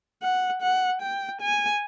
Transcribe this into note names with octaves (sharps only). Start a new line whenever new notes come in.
F#5
F#5
G5
G#5